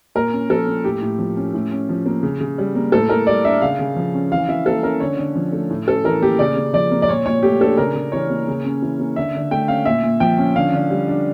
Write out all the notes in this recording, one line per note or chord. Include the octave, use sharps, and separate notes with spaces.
A#2 A#4
C#4
F3 A4
A#3
A2 G4
A2
F3
C#4
A2
C#4
F3
A#3
C#3
C#3
G3
A#3
A2 A4
A2 A#4
G3 D5
D4 E5
C#3 F5
C#3
F3
C#4
E3 F5
E3 E5
A#3 A4
C#4 A#4
D3 C#5
D3
F3
A3
A2
C#4 A4
E3 A#4
A#3 G4
C#3 D5
C#3
F3 D5
A#3
D5
A#2 C#5
A#2 C#5
A3 G4
D4 A4
C#3 A#4
C#3
E3 C#5
A#3
C#3
C#4
E3
A#3
D3 E5
D3
A3 G5
C#4 F5
A#2 E5
A#2
F3 G5
C#4
D3 F5
D3
G3
D4